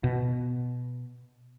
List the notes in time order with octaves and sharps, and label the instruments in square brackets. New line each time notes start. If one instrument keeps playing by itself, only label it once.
[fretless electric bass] B2